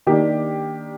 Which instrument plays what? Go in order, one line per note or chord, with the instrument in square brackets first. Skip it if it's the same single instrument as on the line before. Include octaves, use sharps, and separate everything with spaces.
[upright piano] D#3 A#3 D4 G4